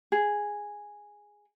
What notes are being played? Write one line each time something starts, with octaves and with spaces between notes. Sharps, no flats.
G#4